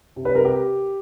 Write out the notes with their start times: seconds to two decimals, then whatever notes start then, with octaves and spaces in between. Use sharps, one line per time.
0.16 C3
0.25 B4
0.35 C3 A#4
0.45 G4